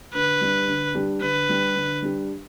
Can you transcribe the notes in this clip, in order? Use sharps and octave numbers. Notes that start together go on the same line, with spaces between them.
D3 B4
G3 D4 G4
D3
G3 D4 G4
D3 B4
G3 D4 G4
D3
G3 D4 G4